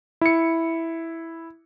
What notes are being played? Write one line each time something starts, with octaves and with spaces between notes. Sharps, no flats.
E4 C#7